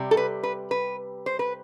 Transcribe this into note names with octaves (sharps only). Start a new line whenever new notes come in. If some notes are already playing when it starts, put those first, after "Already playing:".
Already playing: C3 G3
A4
B4
B4
B4
C5
B4